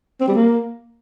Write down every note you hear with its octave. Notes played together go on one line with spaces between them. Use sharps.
C4
G3
A#3